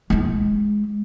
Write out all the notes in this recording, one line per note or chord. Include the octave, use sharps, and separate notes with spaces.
G#3 E4